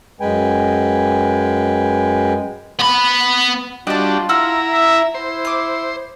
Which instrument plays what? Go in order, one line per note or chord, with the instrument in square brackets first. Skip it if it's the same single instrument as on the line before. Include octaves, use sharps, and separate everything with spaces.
[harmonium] F#2 G#3 B4 G5 G#5
[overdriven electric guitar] B3 B5
[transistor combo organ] G3 D4 F#4 [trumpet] F4 [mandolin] D#5 A5
[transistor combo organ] E4 A#5 [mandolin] F#5 E6 F6
[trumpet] E5
[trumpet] E4 [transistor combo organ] C5
[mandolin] D6 D#6